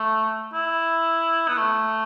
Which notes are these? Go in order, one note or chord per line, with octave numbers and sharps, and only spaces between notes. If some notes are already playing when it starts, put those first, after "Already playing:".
Already playing: A3
E4
B3
A3